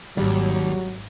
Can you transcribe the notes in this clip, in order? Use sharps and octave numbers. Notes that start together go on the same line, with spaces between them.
G#1 D#2 F#3 G3